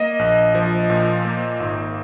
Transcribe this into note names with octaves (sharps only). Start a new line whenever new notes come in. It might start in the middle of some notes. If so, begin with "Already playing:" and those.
Already playing: A#3 D#5
A#1
F3
A#2
A#3
G#1